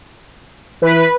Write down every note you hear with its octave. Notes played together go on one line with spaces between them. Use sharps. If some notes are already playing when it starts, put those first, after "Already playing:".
E3 B4